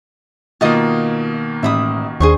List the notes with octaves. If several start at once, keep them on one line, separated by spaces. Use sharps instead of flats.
B2 D#3 A#3 F4 D#5 D#6
A1 E5 B5 D#6
D#2 D4 G#4 C5 C#6